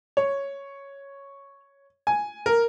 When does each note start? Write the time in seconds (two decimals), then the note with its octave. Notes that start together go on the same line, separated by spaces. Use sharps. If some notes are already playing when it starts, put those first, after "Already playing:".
0.17 C#5
2.07 G#5
2.46 A#4